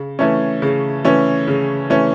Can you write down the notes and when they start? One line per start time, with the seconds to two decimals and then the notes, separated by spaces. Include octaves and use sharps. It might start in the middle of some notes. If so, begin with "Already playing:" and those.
Already playing: C#3
0.19 E3 A3 C#4
0.62 C#3
1.04 E3 A3 C#4
1.47 C#3
1.90 E3 A3 C#4